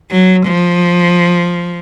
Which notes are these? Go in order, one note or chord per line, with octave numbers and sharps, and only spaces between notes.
F#3
F3